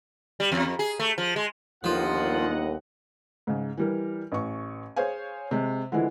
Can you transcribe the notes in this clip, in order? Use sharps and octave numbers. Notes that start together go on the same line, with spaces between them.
G3
E2
F2
G#4
A3
F3
G#3
G1 D#2 F3 F4 D#5 F#5
G#2 C#3
E3 G3 A#4
A1 C#6
G#4 C5 C#5 F5 G#5
C3 G#3
D3 E3 F3 G#3 E4